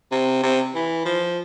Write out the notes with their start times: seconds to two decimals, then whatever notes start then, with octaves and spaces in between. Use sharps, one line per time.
0.11 C3
0.43 C3
0.75 E3
1.05 F3